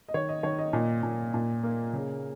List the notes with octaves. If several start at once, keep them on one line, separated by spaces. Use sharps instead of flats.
D#5
D#3 C#5
D#5
D#3 C#5
D#5
A#2 D#5
A#2
A#2
A#3
C#3